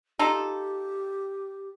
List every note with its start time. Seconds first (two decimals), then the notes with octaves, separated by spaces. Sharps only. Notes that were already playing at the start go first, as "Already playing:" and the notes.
0.19 D#4 F4 G4 A4